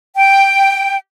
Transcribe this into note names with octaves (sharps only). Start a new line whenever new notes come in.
G5